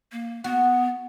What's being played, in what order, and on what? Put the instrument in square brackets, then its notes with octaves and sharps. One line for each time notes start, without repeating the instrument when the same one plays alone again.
[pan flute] A#3
[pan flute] B3 [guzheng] F#4